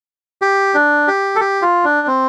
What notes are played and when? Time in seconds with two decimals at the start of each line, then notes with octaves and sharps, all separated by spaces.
0.42 G4
0.74 D4
1.08 G4
1.36 A4
1.41 G4
1.62 F4
1.84 D4
2.07 C4